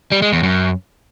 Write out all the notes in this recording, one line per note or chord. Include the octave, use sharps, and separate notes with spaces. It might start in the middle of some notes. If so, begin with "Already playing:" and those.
G3
G#3
E2
F#2